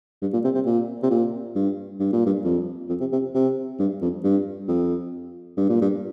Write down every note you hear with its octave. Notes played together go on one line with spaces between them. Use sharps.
G2
A#2
C3
C3
A#2
C3
A#2
G2
G2
A#2
G2
F2
F2
C3
C3
C3
G2
F2
G2
F2
G2
A#2
G2